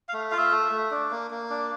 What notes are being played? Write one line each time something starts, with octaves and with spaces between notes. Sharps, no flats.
F5
A3
F4 F5
E5
A3
A3
D4
A#3
A#3
D4